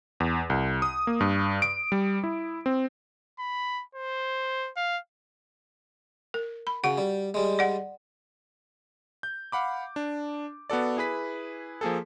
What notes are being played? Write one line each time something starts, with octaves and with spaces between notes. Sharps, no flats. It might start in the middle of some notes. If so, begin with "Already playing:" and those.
E2
C2
D#6
A#3
G2
D7
G3
E4
C4
B5
C5
F5
A#4
B5
C#3 F#4 F#5
G3
G3 G#3
D5 F#5
G6
F5 F#5 B5 D6
D4
B3 F#4 A4 D5
E4 G#4 B4 B6
F3 A#3 G#4 A4